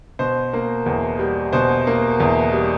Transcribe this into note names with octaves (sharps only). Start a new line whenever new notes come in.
B2 C5
A#3
E2
G3
B2 C5
A#3
E2
G3